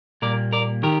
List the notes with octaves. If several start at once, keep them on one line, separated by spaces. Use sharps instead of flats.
A#2 G3 A#3 A#4 D5
A#4 D5
D#3 G4 A#4